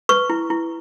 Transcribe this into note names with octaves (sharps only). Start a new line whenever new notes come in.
B4 C#6
E4
E4